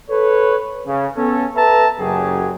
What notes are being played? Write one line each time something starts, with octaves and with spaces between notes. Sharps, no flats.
A4 B4 C#5
C#3
B3 C#4 A4
A4 B4 E5 A5 A#5
F#1 F#2 C#3 F#3 G4 G#4